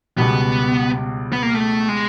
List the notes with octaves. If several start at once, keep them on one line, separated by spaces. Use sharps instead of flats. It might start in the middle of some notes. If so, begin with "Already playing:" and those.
C#2 B2 G3 B3
B3
A#3
A3
G#3